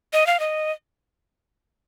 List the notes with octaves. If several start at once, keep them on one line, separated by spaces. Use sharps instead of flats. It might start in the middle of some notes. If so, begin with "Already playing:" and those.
D#5
F5
D#5